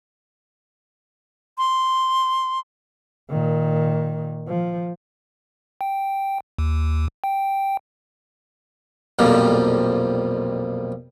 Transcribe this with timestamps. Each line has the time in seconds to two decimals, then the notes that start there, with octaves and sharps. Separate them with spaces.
1.58 C6
3.30 A#2 D#3
4.48 F3
5.81 G5
6.58 D#2
7.24 G5
9.19 B1 F2 A#2 F3 G3